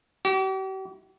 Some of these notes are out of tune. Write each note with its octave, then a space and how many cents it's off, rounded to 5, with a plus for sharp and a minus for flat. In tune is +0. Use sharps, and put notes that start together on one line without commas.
G4 -45